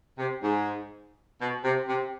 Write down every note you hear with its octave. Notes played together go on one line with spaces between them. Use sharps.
C3
G#2
B2
C3
C3